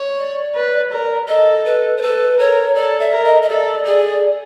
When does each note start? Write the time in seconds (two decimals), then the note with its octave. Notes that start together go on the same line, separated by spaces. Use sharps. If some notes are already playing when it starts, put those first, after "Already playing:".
Already playing: C#5
0.18 D5
0.55 B4
0.92 A#4
1.28 A4 D#5
1.65 B4
1.97 C5
2.02 A4 B4
2.39 A#4 C#5
2.75 A4 D5
3.00 E5
3.12 A#4
3.25 D#5
3.42 D#5
3.49 A4 D5
3.85 G#4 D5